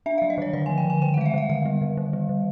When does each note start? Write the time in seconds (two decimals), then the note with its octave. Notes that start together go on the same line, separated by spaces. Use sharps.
0.06 D4 E5
0.18 F5
0.22 F#3
0.30 D#5
0.38 D#3 C#5
0.53 D3 D5
0.66 F3 G#5
0.78 G5
0.85 D3 G#5
1.02 D#3 G5
1.14 F#5
1.17 G#3 F5
1.26 E5
1.34 D#3 F5
1.49 D3 F5
1.65 G3
1.81 D3
1.97 D#3
2.13 G3
2.29 D#3